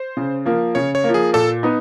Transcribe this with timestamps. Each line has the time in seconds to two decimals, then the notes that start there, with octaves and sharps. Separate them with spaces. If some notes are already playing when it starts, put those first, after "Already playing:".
Already playing: C5
0.17 C#3
0.46 F3 A#3
0.75 C#3 C#5
0.95 C#5
1.04 F3 A#3
1.14 G#4
1.33 A#2 A4
1.63 B3 D#4